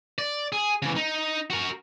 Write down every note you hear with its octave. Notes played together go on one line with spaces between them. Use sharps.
D5
G#4
C#3 E3
D#4
F#4 A#4